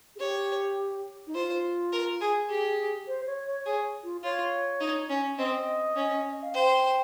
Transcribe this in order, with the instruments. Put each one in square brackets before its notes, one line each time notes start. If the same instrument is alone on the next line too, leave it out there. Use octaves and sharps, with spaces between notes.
[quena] G#4
[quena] G4 [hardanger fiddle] C#5
[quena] D#4
[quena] F4 [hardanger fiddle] C5
[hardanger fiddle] A#4
G#4
[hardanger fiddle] G4 [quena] G#4
[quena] C5
C#5
C#5
[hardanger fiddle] G#4 [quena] C#5
[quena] F4
[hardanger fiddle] F4 [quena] C#5
[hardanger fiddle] D#4
C#4
[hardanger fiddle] C4 [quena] D#5
[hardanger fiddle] C#4
[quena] D#5
F5
[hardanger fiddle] C5 [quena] G5